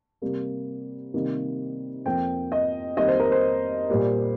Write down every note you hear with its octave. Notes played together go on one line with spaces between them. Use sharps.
C3 G3 A#3
C3 D#3 G3 A#3
F2 F3 A#3 G5
D#5
F2 D#3 G3 A#3 D#5
C5
A#4
C5
A#2 G3 A#3